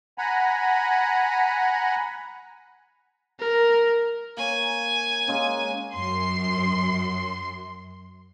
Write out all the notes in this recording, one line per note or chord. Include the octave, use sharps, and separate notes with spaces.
F#5 G#5 A#5 B5
A#4
A#3 C#5 G#5
G#3 A#3 C#4
F#2 C6